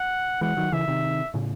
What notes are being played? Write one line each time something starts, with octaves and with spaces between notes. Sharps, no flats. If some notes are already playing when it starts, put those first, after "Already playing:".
Already playing: F#5
E3 G#3 F#5
D#3 F#3
C#3 E3 E5
C3 D#3
A2 C#3